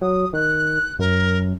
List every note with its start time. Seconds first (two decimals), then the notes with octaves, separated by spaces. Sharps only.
0.01 F#3 D#6
0.33 D#3 F#6
0.99 F#2 A#4